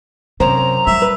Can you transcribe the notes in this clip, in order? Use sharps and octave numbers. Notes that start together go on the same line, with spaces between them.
F#2 C3 C5 A#5
G3 E5
B4